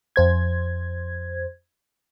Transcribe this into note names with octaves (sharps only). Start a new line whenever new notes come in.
F2 C5 G#6